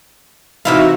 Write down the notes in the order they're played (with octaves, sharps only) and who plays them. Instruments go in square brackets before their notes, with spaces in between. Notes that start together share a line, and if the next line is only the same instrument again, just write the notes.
[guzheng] C3 E4 F5 [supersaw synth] E3 D#4 F#4